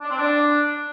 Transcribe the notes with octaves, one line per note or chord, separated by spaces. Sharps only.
D4
C4
D4